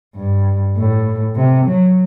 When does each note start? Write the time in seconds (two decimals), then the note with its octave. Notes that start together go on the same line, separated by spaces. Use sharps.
0.16 G2
0.77 A2
1.35 C3
1.66 F#3